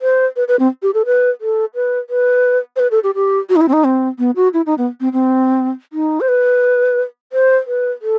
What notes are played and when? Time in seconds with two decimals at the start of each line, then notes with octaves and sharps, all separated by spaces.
0.01 C5
0.36 B4
0.48 B4
0.59 C4
0.82 G4
0.94 A4
1.06 B4
1.41 A4
1.75 B4
2.10 B4
2.76 C5
2.79 B4
2.91 A4
3.03 G4
3.15 G4
3.49 F#4
3.56 D#4
3.61 E4
3.68 C4
3.73 D#4
3.84 C4
4.18 B3
4.36 F#4
4.53 E4
4.66 D#4
4.78 B3
5.00 C4
5.13 C4
5.93 D#4
6.20 C5
6.28 B4
7.32 C5
7.67 B4
8.02 A4